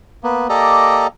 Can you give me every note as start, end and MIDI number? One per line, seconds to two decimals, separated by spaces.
0.24 0.47 58
0.24 0.47 59
0.49 1.07 58
0.49 1.07 67
0.49 1.07 69
0.49 1.07 74
0.49 1.07 75
0.49 1.07 82